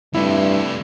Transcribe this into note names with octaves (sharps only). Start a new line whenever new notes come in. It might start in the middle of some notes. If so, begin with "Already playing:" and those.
G2 C3 A3 E4